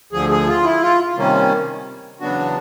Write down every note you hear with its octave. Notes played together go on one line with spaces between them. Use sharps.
D2 D3 F3 G#4
G#4
F4
E4
F4
C3 D#3 G3 A#3 C#4
E2 C#3 F#3 B3 D4 F#4